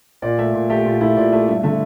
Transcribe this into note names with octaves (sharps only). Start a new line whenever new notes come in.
A#2 D5
A3 E5
A#2
A3 G4
A#2 F4
A3 E4
A#2 D5
A3 E5
G2 E5
D3 A3 E5